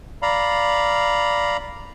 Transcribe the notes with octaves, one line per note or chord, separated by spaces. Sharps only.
D5 F5 A#5 B5